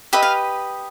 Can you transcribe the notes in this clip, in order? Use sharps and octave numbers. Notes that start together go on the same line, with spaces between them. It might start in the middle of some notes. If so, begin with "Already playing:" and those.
G4 B4 D#5 E5
F5